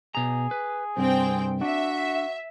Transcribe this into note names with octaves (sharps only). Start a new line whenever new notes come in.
B2 G#4 A#5
B4
C2 G2 C4 G5
D4 F#4 E5